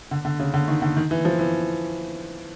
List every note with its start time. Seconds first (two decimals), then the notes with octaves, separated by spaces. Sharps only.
0.11 D3
0.25 D3
0.39 C#3
0.54 D3
0.68 D#3
0.82 D3
0.97 D#3
1.11 E3
1.25 F3
1.39 E3